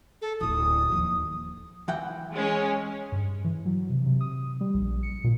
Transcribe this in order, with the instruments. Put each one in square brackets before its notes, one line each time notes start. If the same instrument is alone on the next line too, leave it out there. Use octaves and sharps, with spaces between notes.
[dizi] A4
[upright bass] D1 E4 [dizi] D#6
[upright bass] D#2 F3
[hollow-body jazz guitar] E3 F#5 G5
[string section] G#3 C#4
[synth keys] G2
E3
F#3
C3
C3
D#6
G3
A#1
C#7
A#2